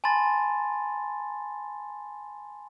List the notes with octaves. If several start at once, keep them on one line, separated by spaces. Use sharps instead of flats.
G#5 A5 B5 C6 A6